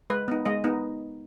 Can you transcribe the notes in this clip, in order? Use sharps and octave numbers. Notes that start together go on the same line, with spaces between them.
G#3 B4
B3 D#4
G#3 D#5
B3 D#4